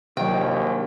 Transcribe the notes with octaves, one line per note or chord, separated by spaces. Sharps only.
A#1 D#2 C3 D#3 F#3 G5